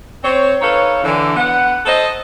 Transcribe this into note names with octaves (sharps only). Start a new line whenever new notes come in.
C4 C#5
D#4 A4 B4 C#5 F5
D3 E3
B3 F#5
A4 C5 D#5